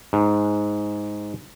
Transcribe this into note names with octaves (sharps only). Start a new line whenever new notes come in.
G#2